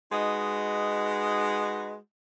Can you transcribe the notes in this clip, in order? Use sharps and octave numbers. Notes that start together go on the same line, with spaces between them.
G#3 D#4 F#4 B4 D#5